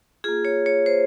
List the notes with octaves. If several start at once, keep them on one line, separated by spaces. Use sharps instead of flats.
A#3 F4 G#4
C#5
C#5
C5